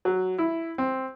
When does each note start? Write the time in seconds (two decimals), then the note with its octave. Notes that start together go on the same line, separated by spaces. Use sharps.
0.05 F#3
0.38 E4
0.78 C4